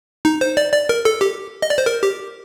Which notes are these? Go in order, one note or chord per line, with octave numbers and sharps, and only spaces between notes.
D#4
C5
D5
D5
A#4
A4
G4
D#5
D5
C5
A#4
G4